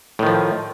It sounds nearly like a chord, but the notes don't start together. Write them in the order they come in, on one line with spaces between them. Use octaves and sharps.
A2 D#3 F3